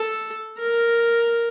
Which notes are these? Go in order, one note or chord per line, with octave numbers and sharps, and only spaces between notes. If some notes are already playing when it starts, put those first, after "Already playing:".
Already playing: A4
A#4